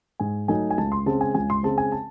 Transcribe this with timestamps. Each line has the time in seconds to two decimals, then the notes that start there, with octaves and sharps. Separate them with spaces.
0.19 G#2 G#5
0.48 F#3 A3 D#4 G#5
0.71 G#5
0.78 C#2 A5
0.92 C6
1.06 C#3 G#3 C4 A5
1.21 G#5
1.35 C#2 G#5
1.50 C6
1.63 C#3 G#3 C4 A5
1.78 G#5
1.92 A5